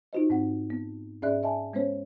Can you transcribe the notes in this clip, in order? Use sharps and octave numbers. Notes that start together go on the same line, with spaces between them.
D#4 F4 F#4 C5 D#5
G#2 C4 F#5
B3
G#2 C#4 G#4 D5 E5 F#6
D#5 E5 G#5 A5
G#3 B3 C#4 C5 C#5